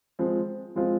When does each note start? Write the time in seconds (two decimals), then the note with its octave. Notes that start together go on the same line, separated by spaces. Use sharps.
0.19 F3 G#3 C4
0.76 F3 G#3 C4 F4